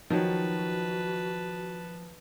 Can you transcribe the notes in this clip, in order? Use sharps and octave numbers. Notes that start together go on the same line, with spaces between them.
D#3 F3 F#3 F#4 B4 A5